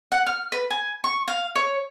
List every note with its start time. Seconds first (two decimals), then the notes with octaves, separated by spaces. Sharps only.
0.12 F#5
0.27 F6
0.52 B4
0.71 G#5
1.04 C#6
1.28 F5
1.56 C#5